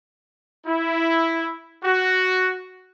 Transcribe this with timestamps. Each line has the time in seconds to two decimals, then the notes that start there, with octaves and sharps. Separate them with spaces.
0.66 E4
1.84 F#4